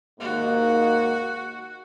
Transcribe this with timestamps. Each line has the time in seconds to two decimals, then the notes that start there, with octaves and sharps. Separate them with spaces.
0.20 D#2 G#2 A#3 F#4